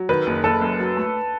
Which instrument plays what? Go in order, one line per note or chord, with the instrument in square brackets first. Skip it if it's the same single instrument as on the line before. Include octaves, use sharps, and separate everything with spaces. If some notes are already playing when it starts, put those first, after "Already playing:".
Already playing: [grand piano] F#3
[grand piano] D#3 [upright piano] B4
[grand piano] F#1
[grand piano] F#1 [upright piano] A4
[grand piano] F#2
F#3
A3